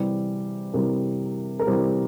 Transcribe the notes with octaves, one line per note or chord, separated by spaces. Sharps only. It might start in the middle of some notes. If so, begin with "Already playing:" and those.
Already playing: C3 E3 G3
C3 E3 G3 A#4
A#4
C3 E3 G3 C5